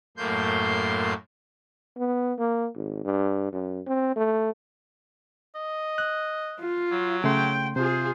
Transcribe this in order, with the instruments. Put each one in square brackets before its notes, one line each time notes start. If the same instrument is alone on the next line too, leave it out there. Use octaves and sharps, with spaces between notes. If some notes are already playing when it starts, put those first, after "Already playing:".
[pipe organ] F#2 A2 A3 A#3 C6 G6
[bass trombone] B3
A#3
G#1
G2
F#2
C4
A3
[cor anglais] D#5
[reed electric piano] F#6
[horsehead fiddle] F4
[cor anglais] F#3
[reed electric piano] C#3 A3 C6 [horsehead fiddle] G5
[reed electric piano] C3 [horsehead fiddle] F4 G#4 [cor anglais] C5